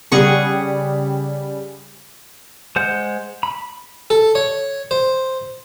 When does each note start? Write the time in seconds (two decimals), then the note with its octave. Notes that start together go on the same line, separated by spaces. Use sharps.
0.12 C#3 G3 G4 G#4 F#5 C#6
2.76 G#3 C5 F#5 G6
3.43 B5
4.10 A4
4.35 C#5
4.91 C5